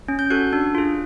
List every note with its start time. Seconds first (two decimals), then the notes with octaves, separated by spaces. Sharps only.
0.08 C#4
0.19 G6
0.30 F#4 A4 F#6
0.53 D4
0.75 F4 G#4